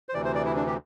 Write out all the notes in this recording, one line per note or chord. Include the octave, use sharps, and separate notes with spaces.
C5
D2 C3 E3 D5
C5
D5
E4
D4
G4